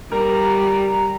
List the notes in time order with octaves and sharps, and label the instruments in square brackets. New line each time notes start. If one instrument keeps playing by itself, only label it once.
[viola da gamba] G3 [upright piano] A#4 [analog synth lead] A#5